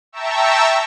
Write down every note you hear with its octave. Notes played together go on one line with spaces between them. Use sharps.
E5 G5 A5 A#5 C#6 E6